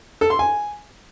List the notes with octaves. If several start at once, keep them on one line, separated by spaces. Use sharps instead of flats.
A4
C6
G#5